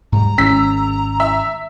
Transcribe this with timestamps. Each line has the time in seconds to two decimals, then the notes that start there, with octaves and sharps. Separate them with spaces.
0.12 G#2 G3 A#5
0.38 G#1 G#3 C#4 E6 B6
1.20 E5